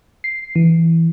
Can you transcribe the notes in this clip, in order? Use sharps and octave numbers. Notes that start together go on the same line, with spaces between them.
C7
E3